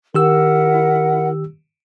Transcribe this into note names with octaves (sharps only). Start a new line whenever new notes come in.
D#3 E4 G4 A#4 F#5 E6